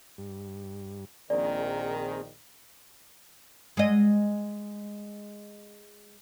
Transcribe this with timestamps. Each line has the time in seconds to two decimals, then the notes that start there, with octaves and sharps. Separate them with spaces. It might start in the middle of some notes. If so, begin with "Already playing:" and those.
0.18 G2
1.30 A#1 D#3 C4 G#4 A#4 D5
3.77 G#3 D#5